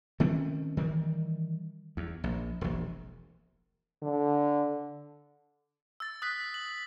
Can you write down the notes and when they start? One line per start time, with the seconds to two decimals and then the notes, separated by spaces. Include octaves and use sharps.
0.20 D#3 A3 C4 C#4
0.77 D#3 E3 G3
1.97 E2
2.24 A#1
2.61 E1 A#1
4.02 D3
6.00 E6 A6
6.22 D#6 F#6 B6
6.54 F#7